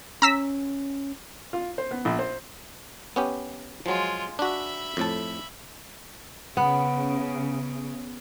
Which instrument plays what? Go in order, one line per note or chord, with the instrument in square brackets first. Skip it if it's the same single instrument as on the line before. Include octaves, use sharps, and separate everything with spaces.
[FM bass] C#4 [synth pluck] A#5 E6 B6
[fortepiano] F4
C5
B3
A#1
C5
[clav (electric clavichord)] B3 C#4 G4
[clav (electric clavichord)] F3 F#3 [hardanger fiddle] G#3 F4
[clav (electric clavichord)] D4 F#4 [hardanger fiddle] E5 B5
[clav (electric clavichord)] F2 A2 A5
[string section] C#3 [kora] B3